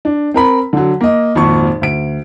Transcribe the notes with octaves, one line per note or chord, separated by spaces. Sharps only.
D4
C4 A#4 B5
D3 F#3
A#3 D#5
G#1 F2 A#2 C#6
D2 D7